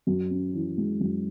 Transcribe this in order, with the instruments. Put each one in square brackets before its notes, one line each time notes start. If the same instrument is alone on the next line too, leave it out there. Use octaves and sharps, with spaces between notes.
[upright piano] F#2
C#4
E3
G#3
F#2